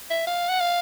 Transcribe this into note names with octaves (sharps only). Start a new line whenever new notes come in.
E5
F5
F#5
F5